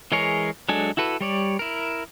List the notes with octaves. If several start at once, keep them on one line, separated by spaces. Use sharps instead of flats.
E3 G#3 G#4 A#4 C#5
F#3 G#3 D4 A4 G#5
E4 F#4 A4 B4
G3 C#5 D5
E4 A#4